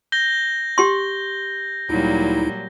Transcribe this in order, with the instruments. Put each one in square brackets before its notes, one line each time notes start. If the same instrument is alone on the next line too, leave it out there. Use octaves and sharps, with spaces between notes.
[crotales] G6 A#6 G7
[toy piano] G4 C6
[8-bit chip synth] D2 D#4 E4 [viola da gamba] A#2 F#3 G3